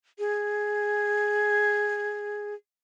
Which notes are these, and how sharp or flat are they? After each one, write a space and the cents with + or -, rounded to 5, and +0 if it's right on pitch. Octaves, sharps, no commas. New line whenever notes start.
G#4 +0